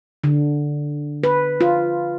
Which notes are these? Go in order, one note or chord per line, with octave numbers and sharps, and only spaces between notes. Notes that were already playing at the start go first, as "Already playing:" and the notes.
D3
B4
F4